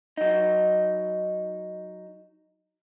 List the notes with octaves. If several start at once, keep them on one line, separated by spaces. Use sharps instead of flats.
F#3 D#4